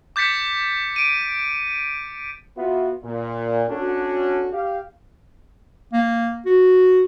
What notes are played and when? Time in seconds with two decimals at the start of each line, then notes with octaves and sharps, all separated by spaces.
0.16 D6 G6 A6 B6 C#7
0.96 D7 D#7
2.57 B3 F4 F#4 E5
3.03 A#2
3.70 C#4 D4 F#4 A4
4.52 G4 F5
5.93 A#3
6.46 F#4